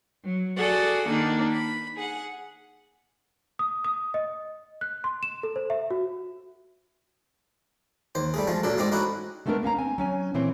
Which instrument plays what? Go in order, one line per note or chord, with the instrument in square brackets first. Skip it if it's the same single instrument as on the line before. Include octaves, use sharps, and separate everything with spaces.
[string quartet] F#3
F#4 G#4 A4 D5 F#5
D#3 A#3 D4 D#4
B5
G#4 F#5
[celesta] D#6
D#6
D#5
F#6
C6
E7
A4
C5
E5
F#4
[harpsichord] D#2 C5
G3 A3 G#4
F3 G#3 A3
A#2 F#3 D4 A4
G#2 G#3 A3 C4 G#4 D5
C#4 D#4 E4 F#4
[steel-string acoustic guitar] G#3 A3 B3 D4 A4 A#4
A#3 C#4 F5 A#5
C4 G#5
F#3 C#4 G#5
A#2 E3 C4 C5 C#5